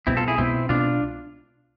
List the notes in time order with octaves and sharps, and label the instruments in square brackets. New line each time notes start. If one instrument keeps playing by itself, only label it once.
[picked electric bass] C2 B2 G#3 B3 [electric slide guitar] C4 E4
[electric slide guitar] F4 A4
E4 G#4
[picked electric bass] C2 B2 G#3 B3 [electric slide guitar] C4 E4
[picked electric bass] C2 B2 G#3 B3 [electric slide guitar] D4 F4